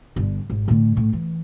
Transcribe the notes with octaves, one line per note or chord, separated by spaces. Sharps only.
G1 D3
G#1
A2 D3
A2
E3